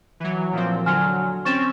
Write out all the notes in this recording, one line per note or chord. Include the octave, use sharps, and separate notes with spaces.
E3 F#3
A#2 F3 C4
D3 F#3 G#5 C6 F6
C4 C#4 C#6 A6 E7